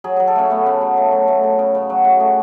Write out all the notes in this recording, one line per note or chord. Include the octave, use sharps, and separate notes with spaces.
F#3 G#4
F#3 G#4
A4
A3 C#4
A3 B3
C#3
F#3
A3
F#3
A3
C#3
C#3
C#3
F#3 F#4
A3 F#4
A3 G#4